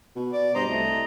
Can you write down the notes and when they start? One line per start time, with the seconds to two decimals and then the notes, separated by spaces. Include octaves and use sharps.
0.16 B2
0.33 D5
0.55 G2 C5 D#5 A#5
0.68 C2 A3